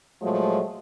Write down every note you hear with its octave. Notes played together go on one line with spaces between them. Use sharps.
A#2 F3 F#3 G#3 A3